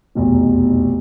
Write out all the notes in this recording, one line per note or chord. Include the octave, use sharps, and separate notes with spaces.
F1 B1 E2